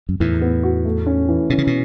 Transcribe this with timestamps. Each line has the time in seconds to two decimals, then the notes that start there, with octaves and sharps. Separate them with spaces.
0.09 F#2
0.20 E2 A2 E3
0.41 B3
0.63 F#4
0.85 A3
1.06 C#4
1.29 E3
1.50 B2 C#4
1.58 C#3
1.67 B2